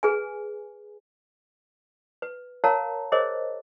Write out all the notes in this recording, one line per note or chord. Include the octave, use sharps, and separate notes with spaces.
G#4 B4 G#5
B4
A#4 C#5 F5 A5 A#5
G#4 A#4 C5 C#5 D#5